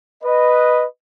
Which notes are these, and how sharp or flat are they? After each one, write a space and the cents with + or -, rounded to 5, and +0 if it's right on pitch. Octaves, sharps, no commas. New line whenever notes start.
B4 +0 D#5 -5